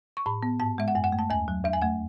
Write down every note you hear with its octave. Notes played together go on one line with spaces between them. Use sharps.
C#6
A2 B5
B3
G#2 A5
G#3 E5
F#5
F#2 G#5
F#5
A3
A5
D#2 G#5
F#3
E2 E5
G#5
A3 F#5